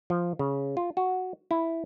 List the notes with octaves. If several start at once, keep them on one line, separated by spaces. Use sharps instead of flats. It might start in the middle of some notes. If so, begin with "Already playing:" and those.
F3
C#3
F4
F#4
E4